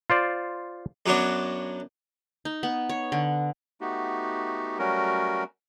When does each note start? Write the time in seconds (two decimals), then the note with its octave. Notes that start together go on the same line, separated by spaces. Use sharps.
0.10 F4 C5 D5
1.06 F#2 F#3 B3 D4
2.45 D#4
2.63 B3
2.89 C#5
3.12 D3
3.81 A3 B3 D#4 F#4 G4
4.79 F#3 G3 A3 C#4 F#4 A#4